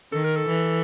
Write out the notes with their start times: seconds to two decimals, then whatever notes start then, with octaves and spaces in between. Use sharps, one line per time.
0.12 D#3 A4
0.24 A#4
0.36 A4
0.48 E3